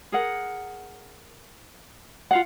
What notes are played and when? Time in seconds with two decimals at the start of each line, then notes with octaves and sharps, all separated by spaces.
0.12 G#4 A#4 F#5
2.31 F4 F5 F#5